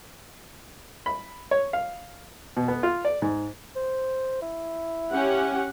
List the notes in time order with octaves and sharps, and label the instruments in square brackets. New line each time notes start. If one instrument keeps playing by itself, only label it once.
[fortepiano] B5
C#5
F5
B2
B3
F4
D5
G#2
[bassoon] C5
E4
[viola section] C#4 G4 F#5